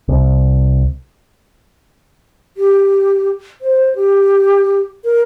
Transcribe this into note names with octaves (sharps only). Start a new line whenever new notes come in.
C2
G4
C5
G4
A#4